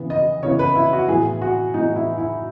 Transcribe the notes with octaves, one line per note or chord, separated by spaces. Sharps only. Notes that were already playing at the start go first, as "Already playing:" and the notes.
Already playing: C#3 E3 B3
D#5
C#3 E3 B3 C#5
B4
E4
F#4
A2 E3 B3 G#4
F#4
A2 E3 B3 D#4
E4
E4